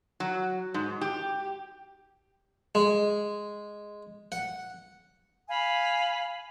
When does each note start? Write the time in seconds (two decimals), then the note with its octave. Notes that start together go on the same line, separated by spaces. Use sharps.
0.20 F#3
0.74 G#2
1.01 G4
2.75 G#3
4.32 F#5
5.48 F5 G#5 B5